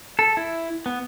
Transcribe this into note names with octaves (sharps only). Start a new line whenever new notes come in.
A4
E4
B3